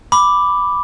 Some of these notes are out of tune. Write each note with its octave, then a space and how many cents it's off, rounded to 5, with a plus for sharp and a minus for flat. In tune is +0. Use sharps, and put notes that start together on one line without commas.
B5 +0 D6 +0